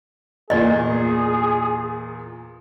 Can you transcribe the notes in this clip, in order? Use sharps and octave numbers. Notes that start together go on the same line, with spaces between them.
E2 A#2 G#4 D5 D#5